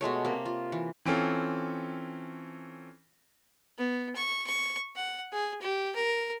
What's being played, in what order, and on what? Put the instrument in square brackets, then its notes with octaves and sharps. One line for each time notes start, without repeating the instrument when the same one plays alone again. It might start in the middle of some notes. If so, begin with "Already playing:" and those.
[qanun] B2 G#3 A3 C#5
C3 A#3
F4
E3
[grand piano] E3 C4 C#4 F4 A4
[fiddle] B3
C#6
C#6
F#5
G#4
G4
A#4